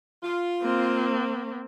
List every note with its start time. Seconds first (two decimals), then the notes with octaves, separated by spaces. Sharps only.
0.23 F4
0.62 A#3 C4